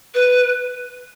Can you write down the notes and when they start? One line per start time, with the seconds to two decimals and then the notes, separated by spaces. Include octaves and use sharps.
0.14 B4